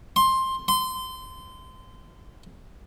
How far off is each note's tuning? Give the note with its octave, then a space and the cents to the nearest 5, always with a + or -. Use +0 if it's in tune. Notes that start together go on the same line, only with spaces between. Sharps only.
C6 +10
C6 -25